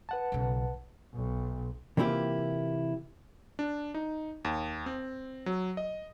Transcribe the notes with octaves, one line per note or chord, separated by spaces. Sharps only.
B4 F#5 A5
B1 C#3
B1
C3 E3 A#3 E4 F4 G4
D4
D#4
D#2
C4
F#3
D#5